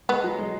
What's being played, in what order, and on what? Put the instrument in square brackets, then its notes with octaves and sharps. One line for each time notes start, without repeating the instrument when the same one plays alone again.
[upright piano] G#3 [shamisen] B3
[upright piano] F#3
G#3